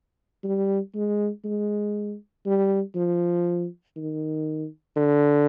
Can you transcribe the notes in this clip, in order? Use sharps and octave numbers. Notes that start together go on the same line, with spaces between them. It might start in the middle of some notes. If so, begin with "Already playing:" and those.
G3
G#3
G#3
G3
F3
D#3
D3